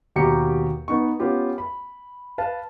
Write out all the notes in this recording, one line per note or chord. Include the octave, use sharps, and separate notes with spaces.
D#2 B2 G4 G5 A#5 C#7
B3 D#4 C#6
B3 C#4 F4 G4
B5
B4 F5 A5